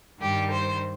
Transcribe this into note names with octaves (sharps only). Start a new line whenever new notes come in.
G2 D#3 G3 G4
C5